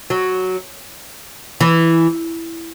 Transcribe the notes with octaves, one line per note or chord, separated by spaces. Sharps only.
F#3
E3